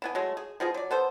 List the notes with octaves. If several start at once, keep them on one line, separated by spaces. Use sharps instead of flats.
E3 B3 G#5
F#3 G#3 A3
G#4
B2 F3 G#3 G#4
F#3 D5
B3 A4 C5